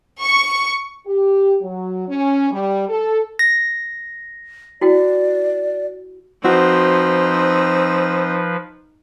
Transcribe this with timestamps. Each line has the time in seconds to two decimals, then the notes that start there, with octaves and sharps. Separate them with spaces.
0.20 C#6
1.07 G4
1.62 F#3
2.09 C#4
2.51 G3
2.89 A4
3.39 A#6
4.81 E4 F#4 D5 G5
6.45 F3 C4 D#4 F#4 B4